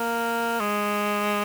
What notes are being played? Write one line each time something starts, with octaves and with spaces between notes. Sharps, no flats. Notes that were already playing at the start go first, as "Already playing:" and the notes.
Already playing: A#3
G#3